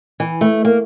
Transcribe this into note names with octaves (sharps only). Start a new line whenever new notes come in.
E3
A3
A#3